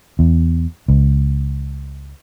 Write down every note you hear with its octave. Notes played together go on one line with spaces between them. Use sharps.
E2
C#2